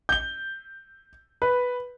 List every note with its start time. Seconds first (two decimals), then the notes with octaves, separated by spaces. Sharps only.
0.09 G6 G7
1.42 B4